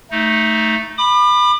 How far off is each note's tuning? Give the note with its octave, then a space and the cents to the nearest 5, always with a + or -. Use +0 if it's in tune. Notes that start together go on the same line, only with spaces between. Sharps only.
A3 +0 D#4 +15
B5 +0 D6 +40